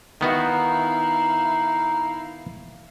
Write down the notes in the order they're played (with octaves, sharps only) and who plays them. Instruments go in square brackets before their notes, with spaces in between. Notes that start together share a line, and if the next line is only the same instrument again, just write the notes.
[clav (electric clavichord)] D#3 B3 F#4 [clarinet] D#4 [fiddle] E4 F5